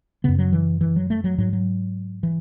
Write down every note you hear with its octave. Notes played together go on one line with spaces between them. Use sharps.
F#2 C#3 B3
F#3
E3
E3
F#3
A3
F#3
G#2 F#3
F#3
E3